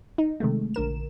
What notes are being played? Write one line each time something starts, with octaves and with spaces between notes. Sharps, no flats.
D#4
C3 D#3 G#3 A3
A#1 D3 A#4 E7